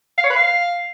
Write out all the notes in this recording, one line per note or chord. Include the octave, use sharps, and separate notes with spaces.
F5
C#5
B4
F5